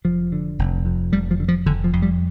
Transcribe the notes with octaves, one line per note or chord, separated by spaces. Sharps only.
F1 F3
D3
F1
F2
F1 G3
F3
D3
F3
F1 D3
F3
F2
G3